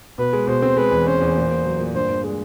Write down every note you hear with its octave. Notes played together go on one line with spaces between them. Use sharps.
B2 B4
G#3
B2 C5
C4
G#3 B4
E2
C#4 C5
E2
A#2
A#2
F#3
A#2
G2 C5
G2
G#3